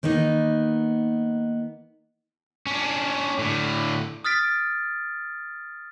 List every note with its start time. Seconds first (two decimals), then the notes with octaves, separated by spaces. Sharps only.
0.03 D#3 A#3 B3 D#4
2.67 C#4 D4
3.39 A2 D3
4.24 D#6 F6 A6 B6 D7